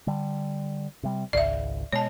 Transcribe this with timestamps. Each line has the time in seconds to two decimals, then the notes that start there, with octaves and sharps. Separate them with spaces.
0.07 D3 G3
1.03 C3 G3
1.33 G#1 C#2 D5 E5
1.93 B2 G#3 C#5 A5